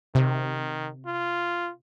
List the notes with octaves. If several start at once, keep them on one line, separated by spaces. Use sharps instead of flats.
C3 D#3
F4